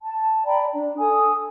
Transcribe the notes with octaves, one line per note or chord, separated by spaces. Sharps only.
A5
D5 G5 A#5 B5
D4
A4 G#5 D#6